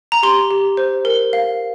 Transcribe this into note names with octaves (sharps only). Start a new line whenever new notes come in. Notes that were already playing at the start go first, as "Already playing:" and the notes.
A#5
G4 C6
G4
C5
A#4
F5